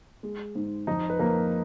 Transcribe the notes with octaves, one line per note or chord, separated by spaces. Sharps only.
G#3
G#2
F2 D#4 D#5
B4
F2 A#3 A#4